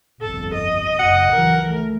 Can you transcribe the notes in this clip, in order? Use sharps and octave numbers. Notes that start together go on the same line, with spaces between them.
G1 C2 F2 A4
D#5
F#1 F#5
C#2 E3 F#3 A#4
E3 A3